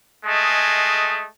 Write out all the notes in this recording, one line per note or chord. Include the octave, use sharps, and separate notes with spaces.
G#3 A3 G#4 D#5